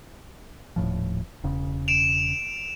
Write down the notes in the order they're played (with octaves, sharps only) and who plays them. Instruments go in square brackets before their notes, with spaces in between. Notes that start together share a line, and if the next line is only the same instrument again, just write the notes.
[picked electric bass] D#1 A2 F3
E1 C#3
[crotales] D7 E7 F7